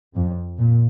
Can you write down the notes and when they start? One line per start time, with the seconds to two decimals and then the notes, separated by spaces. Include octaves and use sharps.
0.15 F2
0.59 A#2